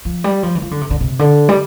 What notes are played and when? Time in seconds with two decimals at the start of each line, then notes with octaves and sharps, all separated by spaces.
0.05 F3
0.24 G3
0.43 F3
0.55 E3
0.62 F3
0.71 D3
0.81 C3
0.90 D3
1.01 C3
1.19 D3
1.49 G3